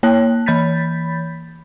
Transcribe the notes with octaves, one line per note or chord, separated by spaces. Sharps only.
A#3 C#5 A5 F#6
E3 B5 G6 A6 B6